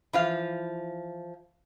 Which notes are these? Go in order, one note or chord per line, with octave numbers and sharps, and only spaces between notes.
E3 F3 F5